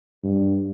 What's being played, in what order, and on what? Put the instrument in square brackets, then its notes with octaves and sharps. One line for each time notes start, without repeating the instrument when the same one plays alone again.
[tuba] G2